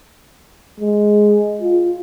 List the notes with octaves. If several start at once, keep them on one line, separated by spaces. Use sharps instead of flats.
G#3
F4